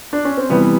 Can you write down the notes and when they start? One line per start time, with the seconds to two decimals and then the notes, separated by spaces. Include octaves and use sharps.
0.13 D4
0.25 C#4
0.37 C4
0.50 C3 E3 G3 B3